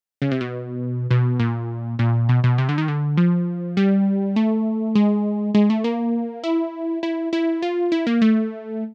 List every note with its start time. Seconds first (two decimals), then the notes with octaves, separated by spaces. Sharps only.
0.22 C#3
0.31 C3
0.41 B2
1.11 B2
1.40 A#2
1.99 A#2
2.29 B2
2.44 B2
2.58 C3
2.69 D3
2.78 D#3
2.88 D3
3.17 F3
3.77 G3
4.36 A3
4.95 G#3
5.55 G#3
5.70 A3
5.84 A#3
6.44 E4
7.03 E4
7.33 E4
7.62 F4
7.92 E4
8.07 A#3
8.22 A3